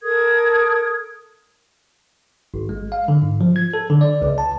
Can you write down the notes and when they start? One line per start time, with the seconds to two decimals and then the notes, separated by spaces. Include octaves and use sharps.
0.02 A4 A#4 D#6 G#6
2.54 G#1
2.69 G#3
2.92 F5
3.08 D3
3.22 G#2
3.41 F3
3.56 G#6
3.74 A4
3.90 D3
4.01 D5
4.22 C#2
4.38 A5